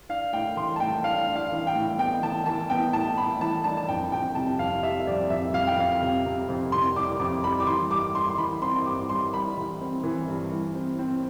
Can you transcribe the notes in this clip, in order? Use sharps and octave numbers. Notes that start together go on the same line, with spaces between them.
D4 F5
A2 G5
E3 C6
A5
A2 G5
D4 F5
D4
F5
E3
G5
A2
B3 G5
E3 A5
E3 A5
B3 G5
A2 A5
A2 B5
E3 A5
D4 A5
A5
F2 G5
F2 G5
C3 A5
F2 F5
G3 E5
F2 D5
F2 E5
F2 F5
G5
F2 F5
C3
C3
F2
C3 C6
G3 D6
F2 D6
G3 B5
D6
E3 C6
G2 D6
G2 C6
C6
E3 B5
C4 C6
C6
G2 D6
G2 C6
G3 B5
E3
C4
E3
G2
E3
C4
C4